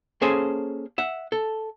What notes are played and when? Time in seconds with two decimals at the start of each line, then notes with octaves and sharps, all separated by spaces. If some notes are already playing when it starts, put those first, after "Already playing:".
0.21 A#3 C#4 G#4 A4 C5 G#5
0.98 E5 F#5
1.32 A4